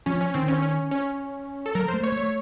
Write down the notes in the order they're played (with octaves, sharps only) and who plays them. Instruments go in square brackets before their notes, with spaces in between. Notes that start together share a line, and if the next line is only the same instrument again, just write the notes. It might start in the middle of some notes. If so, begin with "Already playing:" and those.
[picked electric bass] F3 [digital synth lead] C#4
[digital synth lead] C#4
[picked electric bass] D#3 [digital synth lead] C4
[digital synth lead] C#4
C#4
C#4
A4
[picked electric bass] F#3 [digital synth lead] A#4
[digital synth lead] C5
[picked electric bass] A3
[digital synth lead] C#5
[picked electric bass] A3
[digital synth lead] C#5